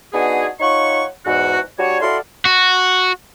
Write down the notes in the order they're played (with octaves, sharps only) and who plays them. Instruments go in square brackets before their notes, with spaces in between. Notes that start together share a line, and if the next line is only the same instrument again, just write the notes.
[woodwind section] B3 D4 D#4 F#4 G#4
D#4 F4 C#5 F#5 C#6
E2 G#2 F#4
G3 D4 F#4 C#5
E4 F#4 A4 D5 F5 C6
[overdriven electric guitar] F#4